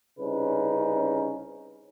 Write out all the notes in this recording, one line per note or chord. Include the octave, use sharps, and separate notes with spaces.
C2 C#3 C#4 D#4 B4